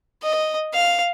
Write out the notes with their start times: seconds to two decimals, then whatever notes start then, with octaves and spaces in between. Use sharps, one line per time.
0.23 D#5
0.74 F5